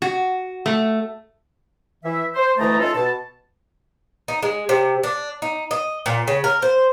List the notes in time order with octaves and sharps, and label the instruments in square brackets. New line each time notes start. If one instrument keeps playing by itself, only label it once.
[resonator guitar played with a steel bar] F#4
A3
[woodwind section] E3 E5
C5
D2 E3 A3 D#5 A5 A#5
C#4 D#4 F4 A4
B2 A5
[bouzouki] D#4
G#3
C3
D4
D#4
D#5
A#2
C#3
A#4
C5